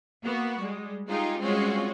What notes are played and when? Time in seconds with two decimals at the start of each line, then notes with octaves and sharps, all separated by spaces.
0.24 A#3 B3 F#4
0.59 G3 G#3
1.08 G#3 D#4 F4 G4 G#4
1.40 G3 G#3 C4 C#4 F4 F#4